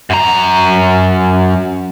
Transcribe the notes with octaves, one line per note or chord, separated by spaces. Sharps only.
F#2 A#5